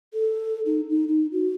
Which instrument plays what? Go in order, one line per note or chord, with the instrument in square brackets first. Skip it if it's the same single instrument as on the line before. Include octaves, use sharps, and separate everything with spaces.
[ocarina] A4
D#4
D#4
D#4
F#4